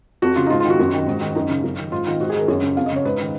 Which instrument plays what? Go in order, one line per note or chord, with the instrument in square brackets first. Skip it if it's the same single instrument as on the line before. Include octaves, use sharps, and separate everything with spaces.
[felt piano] F2 F#4
C#3 F4
D#4
G#2 F4
F4
D#3
F#4
F#2
D#3
G#2
D#3
F#2 D#4
C#3
F#2
D#3
G#2 F4
D#3 F4
G#2 F#4
G#4
D#3 A#4
F#2 C#5
C#3
F2 F5
D#5
C#3
C#5
G#2 B4
D#3